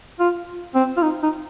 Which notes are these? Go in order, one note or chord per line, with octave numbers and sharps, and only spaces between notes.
F4
C4
F4
D#4
D#4